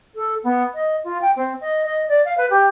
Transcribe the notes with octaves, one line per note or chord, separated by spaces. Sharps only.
A4
B3
D#5
F4
G5
C4
D#5
D#5
D5
F5
B4
G4